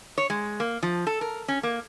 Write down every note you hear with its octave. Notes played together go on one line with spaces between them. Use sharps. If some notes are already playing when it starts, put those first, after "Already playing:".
C#5
G#3
A#3
F3
A4
A#4
C#4
A#3